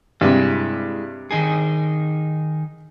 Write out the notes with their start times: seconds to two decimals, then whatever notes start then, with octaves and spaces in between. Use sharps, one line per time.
0.21 G2 C3 G#3 E4
1.31 D#3 D#4 G#4